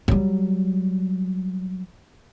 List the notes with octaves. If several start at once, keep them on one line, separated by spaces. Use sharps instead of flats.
F#3 G3